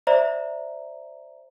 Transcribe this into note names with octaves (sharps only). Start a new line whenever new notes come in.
C5 D5 E5 A#5